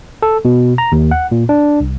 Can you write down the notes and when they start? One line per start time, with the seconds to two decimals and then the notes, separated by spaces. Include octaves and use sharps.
0.22 A4
0.45 B2
0.78 A#5
0.92 D#2
1.11 F#5
1.31 A#2
1.49 D4
1.80 C2